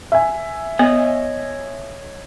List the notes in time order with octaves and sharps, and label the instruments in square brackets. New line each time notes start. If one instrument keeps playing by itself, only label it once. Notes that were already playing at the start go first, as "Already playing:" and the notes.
[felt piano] E5 G#5
[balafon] B3 [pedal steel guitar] C#5 D#5 D#6